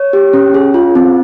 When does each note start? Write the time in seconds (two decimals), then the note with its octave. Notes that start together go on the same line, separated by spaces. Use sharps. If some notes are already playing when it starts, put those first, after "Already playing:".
Already playing: C#5
0.13 G4
0.33 C#4
0.54 G#4
0.74 F4
0.95 C4